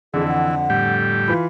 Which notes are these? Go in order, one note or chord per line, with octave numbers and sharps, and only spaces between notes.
F2 D3 E3 G#4
F#5
A2 G3 G4
E3 F4 B5